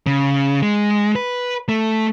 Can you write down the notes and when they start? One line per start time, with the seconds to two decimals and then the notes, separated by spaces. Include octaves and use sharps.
0.07 C#3
0.62 G#3
1.16 B4
1.69 A3